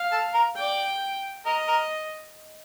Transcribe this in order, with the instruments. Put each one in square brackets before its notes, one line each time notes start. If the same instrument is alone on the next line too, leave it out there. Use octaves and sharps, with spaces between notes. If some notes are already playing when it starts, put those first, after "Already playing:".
Already playing: [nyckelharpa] F5
[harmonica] A4
A#4
[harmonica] D5 [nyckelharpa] G5
[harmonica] A#4 [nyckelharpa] D#5
[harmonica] A#4